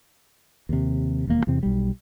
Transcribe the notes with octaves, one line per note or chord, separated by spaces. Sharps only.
D#2 C3
E1 D#2 D3 A#3
E2 C3 C4
B1 G3